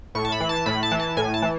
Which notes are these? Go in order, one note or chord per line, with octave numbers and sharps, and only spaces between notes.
A2 C#6
A5
B5
E3
A5
A2 B5
A5
E3
A5
A2 G#5
A5
E3